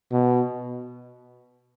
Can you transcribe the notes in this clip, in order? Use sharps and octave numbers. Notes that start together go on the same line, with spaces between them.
B2